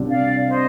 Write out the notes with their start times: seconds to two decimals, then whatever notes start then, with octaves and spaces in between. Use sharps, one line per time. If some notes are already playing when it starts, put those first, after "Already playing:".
Already playing: C2 C3 G3 D4
0.08 D5 F5
0.46 C5 D#5